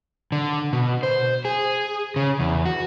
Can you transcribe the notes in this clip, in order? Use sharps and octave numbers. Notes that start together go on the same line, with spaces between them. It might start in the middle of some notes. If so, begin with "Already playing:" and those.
D3
B2
C5
G#4
C#3
E2
F#4